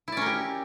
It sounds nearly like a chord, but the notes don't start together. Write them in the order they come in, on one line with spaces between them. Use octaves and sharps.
E4 D5 C#4 A#4 G4